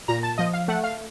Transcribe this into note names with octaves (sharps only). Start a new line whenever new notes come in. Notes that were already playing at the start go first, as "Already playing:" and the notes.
A#2 A#5
A5
F3 D#5
F5
A3 F#5
F5